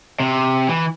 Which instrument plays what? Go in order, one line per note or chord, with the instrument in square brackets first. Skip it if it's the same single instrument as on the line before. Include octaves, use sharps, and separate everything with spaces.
[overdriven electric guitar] C3
E3